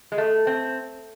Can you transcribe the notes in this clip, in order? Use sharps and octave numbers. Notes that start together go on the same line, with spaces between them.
G#3
A3
C4